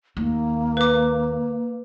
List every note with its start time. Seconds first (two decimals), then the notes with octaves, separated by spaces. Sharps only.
0.17 D#2 A#3
0.77 B4 D6